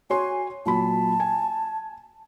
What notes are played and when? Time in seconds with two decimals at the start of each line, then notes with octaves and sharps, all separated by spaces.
0.10 F#4 C#5 G#5 C6
0.66 A#2 F#3 A5 B5
1.20 G#5